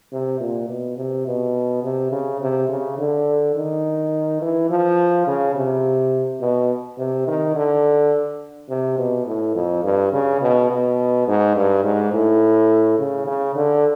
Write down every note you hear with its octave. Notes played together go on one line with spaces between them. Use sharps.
C3
A#2
B2
C3
B2
C3
C#3
C3
C#3
D3
D#3
E3
F3
C#3
C3
B2
C3
D#3
D3
C3
B2
A2
F2
G2
C#3
B2
B2
G#2
G2
G#2
A2
C#3
C#3
D3